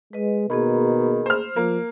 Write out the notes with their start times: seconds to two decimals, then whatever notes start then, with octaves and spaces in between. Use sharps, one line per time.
0.13 G#3 B4 D#5
0.50 B2 D#3 A#3 G#4 B5
1.26 C5 F6
1.56 F3 A#3